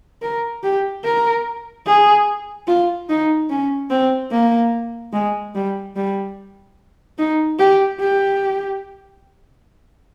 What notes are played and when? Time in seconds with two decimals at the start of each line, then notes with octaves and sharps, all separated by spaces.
0.22 A#4
0.63 G4
1.05 A#4
1.86 G#4
2.67 F4
3.09 D#4
3.50 C#4
3.90 C4
4.31 A#3
5.13 G#3
5.55 G3
5.96 G3
7.18 D#4
7.59 G4
8.00 G4